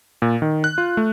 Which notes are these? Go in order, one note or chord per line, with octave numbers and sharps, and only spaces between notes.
A#2
D#3
F#6
F4
A3